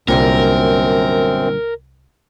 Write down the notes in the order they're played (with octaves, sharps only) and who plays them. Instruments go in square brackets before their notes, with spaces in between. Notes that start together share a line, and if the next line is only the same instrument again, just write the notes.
[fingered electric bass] C2 [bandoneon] F#2 C4 [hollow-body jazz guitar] A#2 D3 G3 [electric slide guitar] A#4